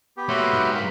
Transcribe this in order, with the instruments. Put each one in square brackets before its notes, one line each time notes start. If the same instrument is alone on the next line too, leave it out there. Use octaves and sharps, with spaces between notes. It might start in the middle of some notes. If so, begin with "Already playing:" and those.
[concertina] B3 G4
[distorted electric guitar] A3 A#3 [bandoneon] F#4 B4 E5 [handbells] C#5 C6 D6
[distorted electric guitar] G#2 [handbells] F6 F#6
[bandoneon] C#3 A#4 [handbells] C6 B6